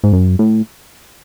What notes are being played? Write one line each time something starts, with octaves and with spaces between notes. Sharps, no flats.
G#2
F#2
A2